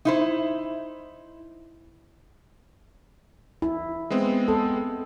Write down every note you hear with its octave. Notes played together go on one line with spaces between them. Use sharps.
D#4 E4 C5
E4
G#3 B3 C4
A4